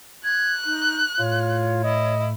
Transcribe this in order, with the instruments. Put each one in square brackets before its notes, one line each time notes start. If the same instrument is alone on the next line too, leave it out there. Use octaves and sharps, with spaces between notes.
[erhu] F#6 [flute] G#6
[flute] D#4 [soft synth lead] G6
[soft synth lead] A2 [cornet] F4 [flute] C#5
[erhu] E4 [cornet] D#5